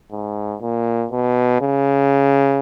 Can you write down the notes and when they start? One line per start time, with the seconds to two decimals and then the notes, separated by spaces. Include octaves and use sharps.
0.12 G#2
0.61 A#2
1.11 B2
1.61 C#3